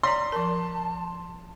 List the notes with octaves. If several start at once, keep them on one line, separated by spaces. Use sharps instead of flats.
C#5 D5 A#5 C6
F3 A#4 A5